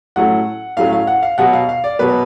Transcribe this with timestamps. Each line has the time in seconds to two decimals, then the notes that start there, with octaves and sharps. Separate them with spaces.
0.16 A2 F#3 A3 C#4 F#5
0.77 A2 F#3 A3 C#4 F5
0.93 F5
1.07 F#5
1.23 F5
1.38 B2 F#3 B3 F#5
1.53 F5
1.69 F5
1.84 D5
1.99 B2 F#3 B3 B4